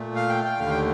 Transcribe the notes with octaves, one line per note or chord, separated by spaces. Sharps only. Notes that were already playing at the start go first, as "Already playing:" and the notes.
Already playing: A#2 A3
F5
G5
G5
D#2 D3 A3 F5
G5